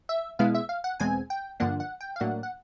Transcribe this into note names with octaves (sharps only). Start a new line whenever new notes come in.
E5
B2 G#3 B3 E4 F5
E5
F5
F#5
E2 B2 G#3 C4 G#5
G5
G2 D3 F3 A#3 D4 F#5
F#5
G5
F5
A2 F#3 A#3 D4 F#5
F#5